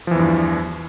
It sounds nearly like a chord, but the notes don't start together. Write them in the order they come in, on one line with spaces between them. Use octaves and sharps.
F3 E3 E2 G2